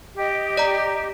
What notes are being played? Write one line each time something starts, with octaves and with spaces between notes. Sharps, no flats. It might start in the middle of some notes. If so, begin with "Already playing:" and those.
G4 D#5
D5 A#5